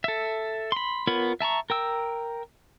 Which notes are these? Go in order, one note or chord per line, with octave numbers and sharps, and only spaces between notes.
A4 E5
B5 C6
B3 F4 A#4 C#5 B5
E5 A5 A#5 C#6
A#4 G5 E6